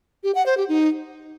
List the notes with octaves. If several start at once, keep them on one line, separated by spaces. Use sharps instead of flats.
G4
F#5
C5
G4
D#4